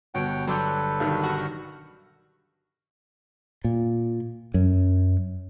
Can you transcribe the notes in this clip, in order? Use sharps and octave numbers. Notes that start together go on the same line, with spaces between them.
G1 B2 C#5 F#5 G5 D7
F#3 D4 A4 B4 C6 D6 G6
B1 G2 D#3
F#4 C#6 F6 A#6
A#2
F#2